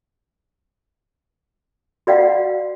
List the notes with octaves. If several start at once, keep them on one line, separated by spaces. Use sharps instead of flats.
F#4 D5 F5 F#5